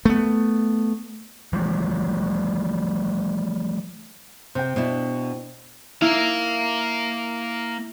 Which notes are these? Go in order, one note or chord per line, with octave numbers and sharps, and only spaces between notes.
A3 B3
E3 F3 G3 A3
C3 C5 G5
B2 D4 E4
A#3 E4 F5